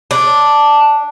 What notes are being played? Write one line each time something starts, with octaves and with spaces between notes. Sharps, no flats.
D4